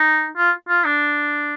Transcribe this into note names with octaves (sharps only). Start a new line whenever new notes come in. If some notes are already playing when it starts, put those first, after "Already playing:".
Already playing: D#4
F4
F4
D4